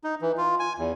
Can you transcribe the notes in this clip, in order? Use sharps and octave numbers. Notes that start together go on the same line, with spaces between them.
D#4
E3
F4
G#5
E2